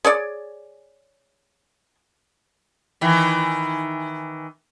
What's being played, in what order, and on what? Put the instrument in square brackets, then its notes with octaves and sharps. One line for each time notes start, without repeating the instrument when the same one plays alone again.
[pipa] G#4 C#5 D5
[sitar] D#3 E3